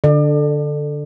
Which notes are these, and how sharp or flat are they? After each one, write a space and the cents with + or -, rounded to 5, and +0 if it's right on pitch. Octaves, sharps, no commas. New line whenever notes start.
D3 +0 D5 +35